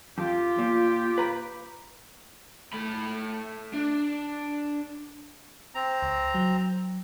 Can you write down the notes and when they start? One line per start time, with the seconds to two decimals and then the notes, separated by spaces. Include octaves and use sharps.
0.18 F2 F4 G4
0.58 A#2
1.18 B4 A#5 B5
2.73 A3 B5
3.74 D4
5.75 C4 A#5
6.02 C#2
6.34 F#3